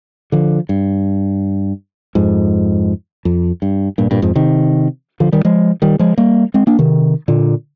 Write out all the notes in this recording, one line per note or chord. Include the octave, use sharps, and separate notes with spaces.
D3 F3
G2
F2 G#2
F2
G2
G2 A#2
G2 A#2
F2 G#2
C3 D#3
D3 F3
D#3 G3
F3 G#3
D#3 G3
F3 G#3
G3 A#3
G#3 C4
A#3 D4
C3 D#3
A#2 D3